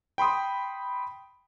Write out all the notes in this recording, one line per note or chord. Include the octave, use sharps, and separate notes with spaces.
G5 B5 C6 D#6